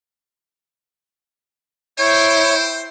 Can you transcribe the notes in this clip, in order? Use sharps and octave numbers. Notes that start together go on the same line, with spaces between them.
E4 C5 C#5 G5